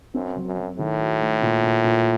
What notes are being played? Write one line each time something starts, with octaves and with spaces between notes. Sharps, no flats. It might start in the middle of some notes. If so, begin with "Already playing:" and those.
F#2 C4
F#3
F#2
F#3
A2 D#3
F#4
A3
A#2
A#2
A#2